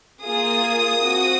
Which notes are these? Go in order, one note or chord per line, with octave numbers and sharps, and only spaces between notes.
A#3 F4 G#4 D#6
C4 F#4